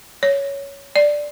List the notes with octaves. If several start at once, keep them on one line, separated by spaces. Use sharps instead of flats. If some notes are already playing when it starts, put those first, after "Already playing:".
C#5
D5